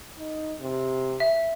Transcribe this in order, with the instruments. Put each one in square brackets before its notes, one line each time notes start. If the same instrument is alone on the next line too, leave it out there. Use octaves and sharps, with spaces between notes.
[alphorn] D#4
C3
[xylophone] E5